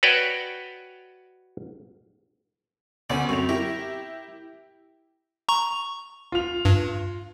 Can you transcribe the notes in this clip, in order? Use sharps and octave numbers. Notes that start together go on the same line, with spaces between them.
F#4 B4 C#5 D5 G5
D2 B3 C#4 D5
F#2 C4 C#6 F7
E4 G4 A#4
A#5 C#6
F4 F7
G2